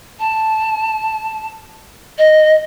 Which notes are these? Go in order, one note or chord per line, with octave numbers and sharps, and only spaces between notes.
A5
D#5